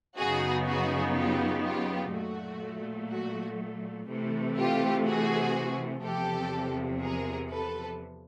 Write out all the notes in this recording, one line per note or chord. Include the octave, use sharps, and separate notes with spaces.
F#2 C#3 F#3 B3 D#4 F#4 G#4
F#4 G#4
F4 G4
F4 G4
A#2 F#3 A3 F#4
F#4
C3 E3 A3
F4 G4
F#4 G#4
E2 C3 F3 G4 A4
G#4 A#4
A4 B4